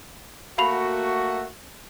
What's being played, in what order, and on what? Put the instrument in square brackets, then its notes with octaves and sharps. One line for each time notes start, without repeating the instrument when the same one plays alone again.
[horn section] A3 A#3 F#4 [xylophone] F5 B5 F7